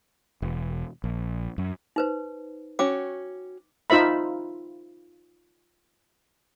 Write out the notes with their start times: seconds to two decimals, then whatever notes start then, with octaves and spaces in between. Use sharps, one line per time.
0.42 E1
1.04 A#1
1.58 F#2
1.96 D#4 B4 C5
2.79 C#4 F#4 G5 D6
3.90 D#4 F4 C5 E5 B5